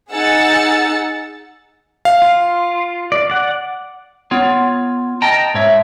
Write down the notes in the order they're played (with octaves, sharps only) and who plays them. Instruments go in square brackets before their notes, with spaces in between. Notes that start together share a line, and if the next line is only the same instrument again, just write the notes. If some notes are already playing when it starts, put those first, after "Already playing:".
[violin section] D#4 G#4 F#5 E6 A6 C#7
[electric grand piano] F5
[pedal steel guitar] F4
D5
D5 F#5
[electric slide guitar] B3 F4 C#5
D#5 G5 A5 A#5
G#2 C#5 E5